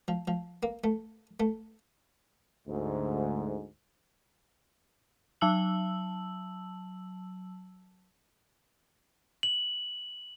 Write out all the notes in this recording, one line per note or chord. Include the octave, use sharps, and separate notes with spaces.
F3
F3
A#3
A3
A3
D2 G#2
F#3 A5 E6 F#7
F#7